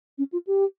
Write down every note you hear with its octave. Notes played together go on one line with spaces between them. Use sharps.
C#4
F4
G4